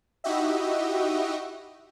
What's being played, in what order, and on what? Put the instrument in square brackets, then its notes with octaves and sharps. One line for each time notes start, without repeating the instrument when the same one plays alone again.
[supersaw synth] D#4 E4 F#4 G4 D#5 E5